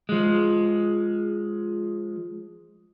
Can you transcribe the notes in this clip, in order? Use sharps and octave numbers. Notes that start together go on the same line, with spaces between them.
F3 G#3